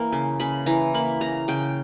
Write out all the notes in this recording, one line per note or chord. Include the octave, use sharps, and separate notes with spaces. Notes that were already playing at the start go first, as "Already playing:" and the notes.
Already playing: E3 A#3
C#3
C#3 B5
E3 A#5
A#3 B5
C#3 A#5
C#3 G5